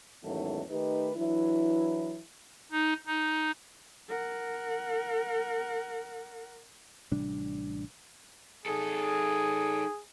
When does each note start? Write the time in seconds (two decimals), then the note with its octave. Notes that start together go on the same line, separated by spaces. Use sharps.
0.23 E2 G#2 D#3 F#3 A3 C#4
0.69 D#3 A3 D#4 G4 B4
1.15 E3 F#3 D4 E4
2.72 D#4
3.07 D#4
4.08 A#4 F#5
7.11 A1 C3 G3 D4
8.66 D#4 G#4 A4